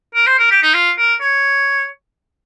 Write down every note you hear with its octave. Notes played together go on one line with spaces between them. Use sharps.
A#4
C5
A#4
G4
D#4
F4
A#4
C#5